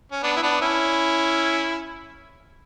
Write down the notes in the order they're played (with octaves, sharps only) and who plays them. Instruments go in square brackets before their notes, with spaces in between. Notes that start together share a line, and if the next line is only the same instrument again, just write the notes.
[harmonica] C#4
B3 D4
E4
B3 D4
C#4 E4